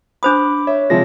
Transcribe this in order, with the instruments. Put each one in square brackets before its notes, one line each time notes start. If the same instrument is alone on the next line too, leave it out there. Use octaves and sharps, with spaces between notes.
[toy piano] D4 C5 D#6 [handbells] B5 D6
[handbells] C#5 [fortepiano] E5
[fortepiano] C3 F3 G#3 [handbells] A#6